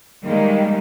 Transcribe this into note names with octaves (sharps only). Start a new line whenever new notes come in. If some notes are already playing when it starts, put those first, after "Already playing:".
D#3 G3 G#3 A#3